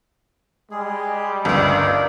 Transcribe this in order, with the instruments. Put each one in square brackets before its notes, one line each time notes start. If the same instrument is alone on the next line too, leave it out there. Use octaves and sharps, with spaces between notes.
[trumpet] G3 [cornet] G#3 [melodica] G#4
[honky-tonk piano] G1 C#2 [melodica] D#4 A4 A#4 [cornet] D5